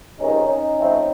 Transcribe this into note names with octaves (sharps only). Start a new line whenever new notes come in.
C#2 C3 D#3 C#4 D#4
C#4 D#4
A2 F3 A3 C4